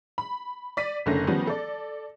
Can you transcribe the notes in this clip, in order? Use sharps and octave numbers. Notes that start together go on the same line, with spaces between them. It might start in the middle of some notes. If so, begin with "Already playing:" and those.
B5
D5 B6 D#7
F#1 D3 A3 C#4 A#6
D#3 F3 G3 B3 C#4
A4 D5